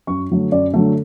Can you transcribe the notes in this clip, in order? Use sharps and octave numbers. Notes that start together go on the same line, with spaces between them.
F#2 C#6
D3 F#3 A3
F#2 D5
D3 F#3 A3